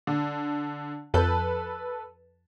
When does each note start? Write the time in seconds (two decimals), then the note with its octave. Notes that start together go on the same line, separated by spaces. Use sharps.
0.07 D3
1.14 F2 A4 B4 A5 G6